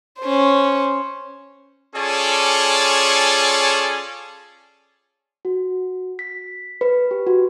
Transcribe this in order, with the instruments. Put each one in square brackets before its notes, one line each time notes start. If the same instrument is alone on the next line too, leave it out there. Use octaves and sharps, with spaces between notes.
[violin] C#4 C5
[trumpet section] C#4 F4 G#4 A4 C#5 D5
[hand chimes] F#4
B6
B4
G4
F#4